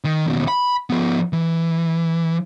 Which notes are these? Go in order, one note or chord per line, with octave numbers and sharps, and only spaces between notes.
D#3
D#2 B2
B5
F3 B3
E3